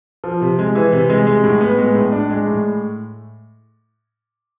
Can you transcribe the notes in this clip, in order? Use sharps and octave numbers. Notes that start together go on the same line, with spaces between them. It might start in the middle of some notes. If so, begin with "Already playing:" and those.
F3
C3
G#3
E3
C3
G#3
G#3
A2
B3
G#3
A2
D4
G#3
A2